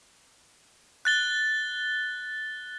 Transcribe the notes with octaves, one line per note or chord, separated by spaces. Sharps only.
F#6 A6 G7